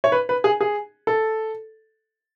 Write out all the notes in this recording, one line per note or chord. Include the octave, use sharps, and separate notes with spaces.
C#5
B4
B4
G#4
G#4
A4